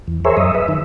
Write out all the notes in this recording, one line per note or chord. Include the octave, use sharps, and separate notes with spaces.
E2
G#4 A#4 C5 C#5 E5
F#2 D#5 E5
B4 E5
D#3